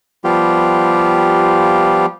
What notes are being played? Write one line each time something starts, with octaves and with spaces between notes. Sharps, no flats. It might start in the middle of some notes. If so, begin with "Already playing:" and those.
F3 G3 B3 F4 G4